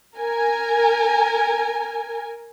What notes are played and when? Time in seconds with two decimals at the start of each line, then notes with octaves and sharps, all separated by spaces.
0.18 A#4 G#5